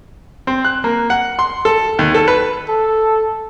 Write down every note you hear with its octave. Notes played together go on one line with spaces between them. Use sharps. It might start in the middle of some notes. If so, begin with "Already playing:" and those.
C4
F#6
A#3
F#5
C6
A4
D#2
A4
B4
A4